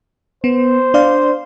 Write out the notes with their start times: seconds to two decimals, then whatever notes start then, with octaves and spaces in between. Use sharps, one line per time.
0.44 B3 C5
0.94 D4 D5 F5